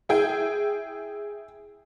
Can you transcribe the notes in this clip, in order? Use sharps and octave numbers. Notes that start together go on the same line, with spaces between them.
E4 G#4 G5